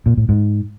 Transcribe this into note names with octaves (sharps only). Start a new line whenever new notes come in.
A#2
A2
G#2